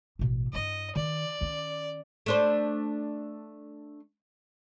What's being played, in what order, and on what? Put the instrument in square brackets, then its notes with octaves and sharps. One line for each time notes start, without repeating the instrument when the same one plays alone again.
[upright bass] A1 B2
[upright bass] G2 E4 [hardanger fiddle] D#5
[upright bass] D#3 [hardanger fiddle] D5
[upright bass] D#3 C#4
[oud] A3 D4 C5